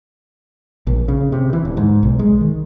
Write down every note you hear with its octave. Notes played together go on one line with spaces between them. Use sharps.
A#1
C#3
C3
E3
D1
G#2
B1
G#3
D#3